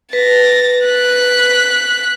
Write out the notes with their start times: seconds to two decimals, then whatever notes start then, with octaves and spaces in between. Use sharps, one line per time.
0.13 B4 A6 A#6
0.85 F#6 B6